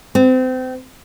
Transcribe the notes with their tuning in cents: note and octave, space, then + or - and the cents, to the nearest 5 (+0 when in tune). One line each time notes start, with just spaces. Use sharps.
C4 -30